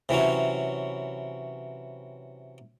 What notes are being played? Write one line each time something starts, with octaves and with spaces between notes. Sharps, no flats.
C3 E3 F#3 C#4